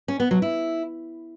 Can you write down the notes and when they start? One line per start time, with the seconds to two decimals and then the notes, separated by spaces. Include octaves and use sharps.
0.08 C#4
0.20 B3
0.31 F#3
0.42 E4